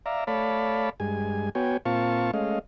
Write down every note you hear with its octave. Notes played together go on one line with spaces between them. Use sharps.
D5 E5 F5 A#5
A3 C#5 D5 F5 A5 B5
G2 G#3 G#5
B3 F#4 C#5 G5 G#5
A#2 C4 F4 F5 A5 C#6
G#3 A3 C#4 D#5 F5